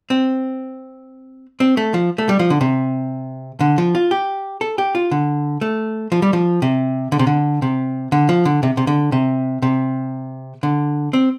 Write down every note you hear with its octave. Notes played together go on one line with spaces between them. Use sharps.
C4
C4
A3
F3
A3
G3
F3
D3
C3
D3
F3
F4
G4
A4
G4
F4
D3
A3
F3
G3
F3
C3
D3
C3
D3
C3
D3
F3
D3
C3
C3
D3
C3
C3
D3
C4